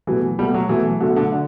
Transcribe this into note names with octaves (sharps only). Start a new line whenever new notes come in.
B2 E3 F#3 A3
B2 F#3 G3 A3
F#3
B2 E3 F#3 A3
B2 D3 F#3 A3
D3
D3